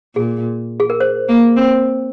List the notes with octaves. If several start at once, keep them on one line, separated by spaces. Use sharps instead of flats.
A#2 G#4
G#4
A#4
C5
A#3
C4